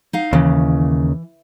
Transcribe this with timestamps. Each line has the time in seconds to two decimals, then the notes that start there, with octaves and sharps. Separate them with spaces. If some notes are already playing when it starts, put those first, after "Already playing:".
0.13 D#4 F5
0.33 D#2 C#3 E3